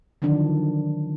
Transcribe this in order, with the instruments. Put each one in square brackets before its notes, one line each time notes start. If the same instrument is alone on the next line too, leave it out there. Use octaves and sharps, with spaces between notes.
[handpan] D3 D#3 F3 F#3 D4